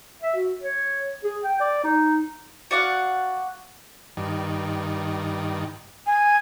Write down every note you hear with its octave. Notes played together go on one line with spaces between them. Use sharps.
E5
F#4
C#5
G#4
G5
D5
D#4
F#4 D5 F5 F#5
G2 D#3
G#5